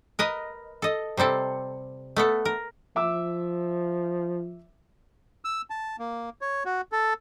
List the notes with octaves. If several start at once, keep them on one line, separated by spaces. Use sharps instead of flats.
A#4 B4 D#5
A4 D#5
C3 G3 C4 A4
A3 B3 A4
A#4
F3 E5 D6 E6
E6
A5
A#3
C#5
F#4
A4